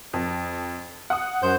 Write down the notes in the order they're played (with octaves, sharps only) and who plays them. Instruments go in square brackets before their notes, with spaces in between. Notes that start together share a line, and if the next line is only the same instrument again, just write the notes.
[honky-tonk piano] F2
F#5 D#6
[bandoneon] F#2 C5 G6